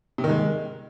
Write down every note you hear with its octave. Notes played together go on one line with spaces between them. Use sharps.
C3
D#3
G#3